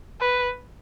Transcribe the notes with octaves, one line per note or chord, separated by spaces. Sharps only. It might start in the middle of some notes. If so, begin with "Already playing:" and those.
B4